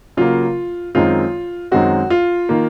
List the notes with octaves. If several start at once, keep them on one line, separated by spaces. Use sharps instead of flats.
C#3 F#3 A#3 F4
F#2 D#3 G#3 C4 F4
F#2 D#3 G#3 C4 F#4
F4
D#3 A#3